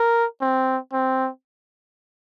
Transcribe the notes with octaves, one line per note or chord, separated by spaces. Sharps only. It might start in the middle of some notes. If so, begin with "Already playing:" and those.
Already playing: A#4
C4
C4